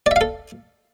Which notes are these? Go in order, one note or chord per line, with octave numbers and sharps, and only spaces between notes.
A4 D5 E5 F5